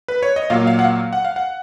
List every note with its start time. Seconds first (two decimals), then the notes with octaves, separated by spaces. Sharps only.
0.08 B4
0.22 C#5
0.36 D#5
0.50 A#2 F#3 A#3 F5
0.67 F5
0.79 F#5
0.84 F5
1.13 F#5
1.25 F5
1.36 F#5